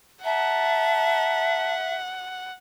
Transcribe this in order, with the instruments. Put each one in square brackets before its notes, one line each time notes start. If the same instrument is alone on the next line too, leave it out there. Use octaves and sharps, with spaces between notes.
[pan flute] E5 [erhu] F#5 [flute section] A5 A#5